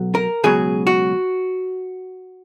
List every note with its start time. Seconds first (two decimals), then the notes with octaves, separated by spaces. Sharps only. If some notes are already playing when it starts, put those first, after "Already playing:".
Already playing: B1 F#3
0.15 A#4
0.44 C#2 B2 F#3 G#4
0.87 F#4